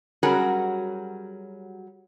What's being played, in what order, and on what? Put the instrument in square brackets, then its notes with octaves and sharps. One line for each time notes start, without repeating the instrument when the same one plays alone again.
[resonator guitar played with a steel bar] F#3 G3 C#4 F#4 G#4 A#4